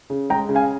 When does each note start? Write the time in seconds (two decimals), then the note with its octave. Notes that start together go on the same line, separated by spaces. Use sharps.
0.10 C#3
0.30 G#3 G5 A#5
0.49 C#3
0.55 F5 G#5